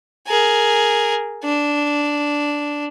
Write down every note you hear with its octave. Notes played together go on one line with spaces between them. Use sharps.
G#4 A#4
D4